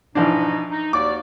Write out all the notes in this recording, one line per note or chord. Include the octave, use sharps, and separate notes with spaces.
G#2 B2 E3 F3 D4 D#4
D#4
D#2 F#4 D5 D6